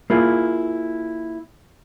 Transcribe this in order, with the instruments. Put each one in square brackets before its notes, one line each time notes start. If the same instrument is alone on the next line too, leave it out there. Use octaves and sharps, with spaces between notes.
[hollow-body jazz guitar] A#3 E4 F4 G#4